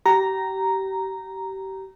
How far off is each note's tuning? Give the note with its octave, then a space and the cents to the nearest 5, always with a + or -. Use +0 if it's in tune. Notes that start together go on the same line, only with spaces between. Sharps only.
G4 -30 A#5 +0